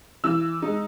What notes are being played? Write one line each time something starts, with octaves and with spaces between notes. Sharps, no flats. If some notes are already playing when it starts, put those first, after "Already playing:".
E3 E6
G#3 D#4